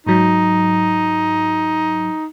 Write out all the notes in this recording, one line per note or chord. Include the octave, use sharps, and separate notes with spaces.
G#2 F#3 D#4